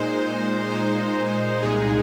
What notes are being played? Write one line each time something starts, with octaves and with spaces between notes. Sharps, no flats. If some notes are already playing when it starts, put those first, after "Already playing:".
Already playing: A#2 G#3 D#4 C5
A#2 G#3 D#4 C5
C2 A#2 G#3 D#4 G#4